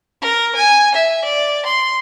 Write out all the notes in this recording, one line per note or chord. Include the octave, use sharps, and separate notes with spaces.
A#4
G#5
E5
D5
C6